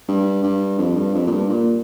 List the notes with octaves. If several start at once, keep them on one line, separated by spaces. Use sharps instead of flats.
G2
G2
F2
G2
F2
A#2
G2
A#2